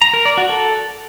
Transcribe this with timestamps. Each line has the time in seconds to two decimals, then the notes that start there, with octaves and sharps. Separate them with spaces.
0.02 A#5
0.14 A#4
0.26 D5
0.38 F#4
0.49 A4